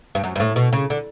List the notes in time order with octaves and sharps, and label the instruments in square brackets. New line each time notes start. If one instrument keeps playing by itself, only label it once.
[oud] G2
F#2
G2
A2
B2
C#3
D3